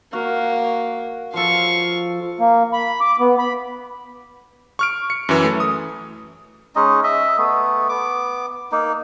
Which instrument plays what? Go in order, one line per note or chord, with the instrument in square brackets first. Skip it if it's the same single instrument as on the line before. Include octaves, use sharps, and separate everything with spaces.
[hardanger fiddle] A#3 [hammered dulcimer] F#4 F5
[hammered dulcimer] F3 A4 [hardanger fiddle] F5 C#6
[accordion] A#3
B5
D6
B3
B5
[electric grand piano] C#6 F6 D7
C#7
F#2 E3
A3
D#6
[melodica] G#3 C#4 D#4 D#5
D#5 E5
A3 B3
B3 D6
A#3 D#4